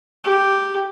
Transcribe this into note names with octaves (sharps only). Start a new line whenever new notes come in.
G4